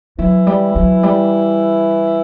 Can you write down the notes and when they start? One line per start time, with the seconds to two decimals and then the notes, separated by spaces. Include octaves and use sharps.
0.19 E3 F#3 E4
0.47 G3
0.76 F#3
1.03 G3